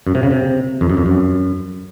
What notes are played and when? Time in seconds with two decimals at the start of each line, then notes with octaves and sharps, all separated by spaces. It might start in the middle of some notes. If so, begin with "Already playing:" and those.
0.07 F#2
0.15 C3
0.23 C#3
0.31 C3
0.81 F2
0.90 F#2
0.97 F2
1.06 F#2